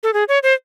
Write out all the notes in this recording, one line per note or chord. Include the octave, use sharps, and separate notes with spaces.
A4
G#4
C#5
C5